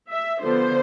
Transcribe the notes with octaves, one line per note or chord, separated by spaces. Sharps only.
E5
D3 F3 B3 C5